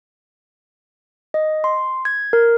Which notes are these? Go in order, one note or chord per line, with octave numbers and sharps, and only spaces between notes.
D#5
C6
G#6
A#4